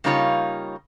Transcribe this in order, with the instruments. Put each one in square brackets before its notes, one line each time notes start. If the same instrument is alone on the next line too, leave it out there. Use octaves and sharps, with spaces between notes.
[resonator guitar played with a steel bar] C#3 G3 A#3 D#4 F4 C#5